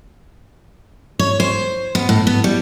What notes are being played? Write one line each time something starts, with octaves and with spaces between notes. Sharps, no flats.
C#5
C5
B3
A2
B3
G3